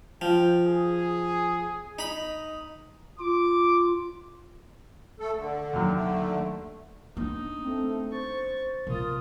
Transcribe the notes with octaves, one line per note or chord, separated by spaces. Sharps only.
F3 G5
G#4
D#4 D#5 B5
F4 D6
A3 A4
D3
D#2 F#3
D3 A3
B3 D4 D#4
A3 C4
C5 C#6 A6
B2 F4 A#4 D#6